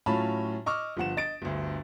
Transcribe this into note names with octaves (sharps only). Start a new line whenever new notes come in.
A2 F#3 C#4 F4 A5 B5
D#5 C#6 D6 E6 F6
G1 F3 F#5 E7
D#5 A6 D7
G1 D2